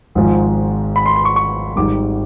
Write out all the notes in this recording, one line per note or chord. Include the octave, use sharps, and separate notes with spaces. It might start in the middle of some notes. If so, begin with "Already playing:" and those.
G#1 G#2 F3 G#3
B5
C6
C6
C#6
C#6
G#1 G#2 D#3 G3 D6